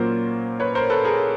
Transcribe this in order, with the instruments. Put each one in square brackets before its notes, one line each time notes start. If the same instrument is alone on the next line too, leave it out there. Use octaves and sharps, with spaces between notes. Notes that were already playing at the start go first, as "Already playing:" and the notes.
Already playing: [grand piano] A#2 F#3 A#3 C#4 F4 A#4 C5
B4 C#5
A#4 C5
A4 B4
G#4 A#4